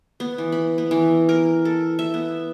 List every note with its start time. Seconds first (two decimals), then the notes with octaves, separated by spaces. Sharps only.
0.20 B3
0.38 E3
0.52 B5
0.78 B3
0.91 E3
1.29 A#4
1.65 A4
1.99 E5
2.14 B3